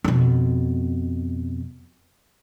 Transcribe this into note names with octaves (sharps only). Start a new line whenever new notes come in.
F2 B2